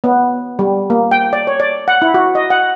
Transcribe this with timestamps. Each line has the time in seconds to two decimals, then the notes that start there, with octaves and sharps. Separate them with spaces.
0.04 B3
0.59 G3
0.90 A#3
1.11 G5
1.33 D5
1.47 C#5
1.60 D5
1.88 F#5
2.02 E4
2.14 F#4
2.35 D#5
2.50 F#5